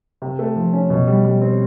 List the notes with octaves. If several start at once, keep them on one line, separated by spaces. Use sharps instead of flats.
C3
A3
F3
C#4
B2
G3
G3
C4